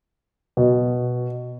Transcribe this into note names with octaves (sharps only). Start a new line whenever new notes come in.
B2